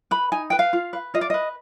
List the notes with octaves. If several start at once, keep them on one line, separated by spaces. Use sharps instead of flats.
B4 B5
D#4 G#5
B4 G5
F5
F4
B4
F4 D#5
D5
B4 D#5